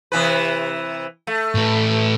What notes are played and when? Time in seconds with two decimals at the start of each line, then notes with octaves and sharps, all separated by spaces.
0.12 C3 E3 B4
1.27 A3
1.55 A2 B4